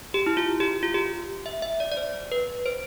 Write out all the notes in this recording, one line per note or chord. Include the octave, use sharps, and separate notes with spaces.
G4
E4
F4
G4
F4
G4
E5
E5
D5
D5
C5
B4
C5